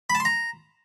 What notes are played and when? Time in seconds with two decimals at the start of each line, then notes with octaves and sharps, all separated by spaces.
0.10 B5
0.15 A5
0.20 C6
0.25 A#5